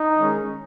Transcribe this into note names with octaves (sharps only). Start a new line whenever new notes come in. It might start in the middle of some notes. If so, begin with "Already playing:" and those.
Already playing: D#4
D#3 G#3 C#4